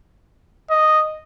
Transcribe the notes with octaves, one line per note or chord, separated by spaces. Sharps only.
D#5